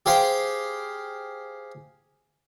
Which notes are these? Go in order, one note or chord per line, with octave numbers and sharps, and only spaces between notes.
G4 G#4 C5 F5 G5